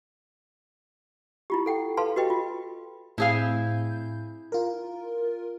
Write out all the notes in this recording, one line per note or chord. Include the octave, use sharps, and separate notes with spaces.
E4 F4 G4
A4 F#5 G5
A4 B4 F5 A5 C6
F#4 G4 B4 D#5 G5
F4
A2 C4 E4 G#4 F5 G6
F4 A#4